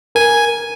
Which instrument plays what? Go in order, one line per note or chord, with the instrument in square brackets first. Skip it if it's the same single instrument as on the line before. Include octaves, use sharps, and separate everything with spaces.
[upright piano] A#4 [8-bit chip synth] G#5